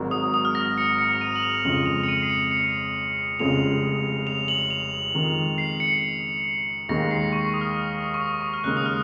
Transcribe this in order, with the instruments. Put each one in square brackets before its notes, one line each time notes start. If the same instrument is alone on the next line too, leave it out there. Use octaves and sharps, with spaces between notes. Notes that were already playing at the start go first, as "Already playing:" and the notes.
Already playing: [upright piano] G#1 G#2 F#3
[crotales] D#6
D#6
F6
A#6
A#6
C#7
C#7
F7
D#7
F#7
F7
[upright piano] F2 C#3 G#3 [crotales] F#7
[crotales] F7
C#7
D#7
C7
C#7
C#7
[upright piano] F1 F2 C#3 G#3 [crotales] F7
[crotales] F7
F#7
F7
[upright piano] F2 D#3 G#3
[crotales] C7
C#7
[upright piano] D#2 D#3 G#3 [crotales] A#6
[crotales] C7
C#6
D#6
F6
C#6
D#6
C#6
F6
[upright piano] D#2 C#3 G#3 [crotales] F#6
[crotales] D#6
F6